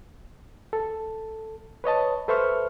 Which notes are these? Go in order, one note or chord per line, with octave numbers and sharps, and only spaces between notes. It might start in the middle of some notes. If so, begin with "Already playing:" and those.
A4
B4 C#5 D#5 A5
A4 B4 C5 E5 C#6 F6